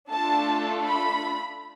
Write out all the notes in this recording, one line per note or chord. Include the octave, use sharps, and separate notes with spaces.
A3 D4 F4 A4 A5
B5